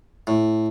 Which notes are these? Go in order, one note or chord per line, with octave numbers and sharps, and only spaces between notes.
A2